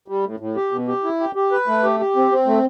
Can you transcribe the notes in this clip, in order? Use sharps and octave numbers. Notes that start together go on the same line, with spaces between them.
G3
A2
A2
G4
B2
G4
E4
G4
G4
B4
A3
G4
G4
C4
C4
A3